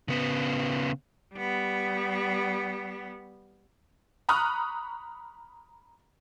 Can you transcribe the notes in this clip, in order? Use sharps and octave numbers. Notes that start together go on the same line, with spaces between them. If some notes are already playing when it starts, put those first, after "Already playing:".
C#3 B3
G3 B3
A#5 B5 C#6 D#6 F6 F#6